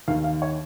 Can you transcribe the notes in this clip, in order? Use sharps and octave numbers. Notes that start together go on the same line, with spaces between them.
D#2 D#3 F5
F5
C#5